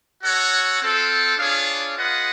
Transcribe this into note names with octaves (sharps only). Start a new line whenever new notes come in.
F#4 A4 C#5 F#5
C4 F4 A4
D4 F4 G#4 C#5 F5
F4 G#4 B4 D#5 F#5